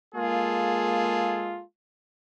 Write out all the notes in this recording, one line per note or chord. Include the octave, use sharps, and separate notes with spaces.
G#3 A#3 F4 G#4 A4